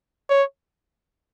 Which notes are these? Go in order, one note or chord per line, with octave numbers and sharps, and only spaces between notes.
C#5